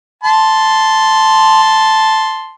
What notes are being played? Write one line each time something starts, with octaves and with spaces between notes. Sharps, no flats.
A5 C6